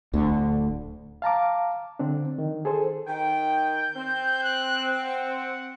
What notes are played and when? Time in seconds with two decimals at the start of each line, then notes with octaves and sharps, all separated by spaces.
0.13 D1 D2 D3
1.22 F5 A5 A#5 D6
1.99 D3 C4 D4
2.39 D#3
2.65 G#4 A4 C5
3.07 D#3 G5
3.50 G6
3.95 C4
4.43 F#6
5.01 F#5